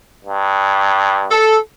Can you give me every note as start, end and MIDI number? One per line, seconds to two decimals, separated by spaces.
0.25 1.41 43
1.31 1.58 69